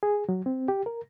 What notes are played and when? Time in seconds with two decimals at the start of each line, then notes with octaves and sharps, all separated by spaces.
0.03 G#4
0.29 F#3
0.46 C4
0.68 G4
0.86 A#4